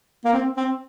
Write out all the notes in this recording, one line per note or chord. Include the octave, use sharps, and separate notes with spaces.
A#3
C4
C4